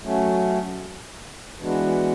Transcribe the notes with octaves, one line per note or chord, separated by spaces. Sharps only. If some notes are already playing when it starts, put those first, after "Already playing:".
F#3 A3 C#4
E3 G#3 B3 D4 F#4